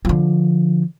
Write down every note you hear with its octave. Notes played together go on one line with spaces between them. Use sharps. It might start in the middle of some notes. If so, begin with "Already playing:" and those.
D3 F3